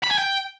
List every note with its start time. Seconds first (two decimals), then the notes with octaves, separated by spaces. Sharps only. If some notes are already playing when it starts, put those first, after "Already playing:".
0.03 B5
0.11 G#5
0.18 G5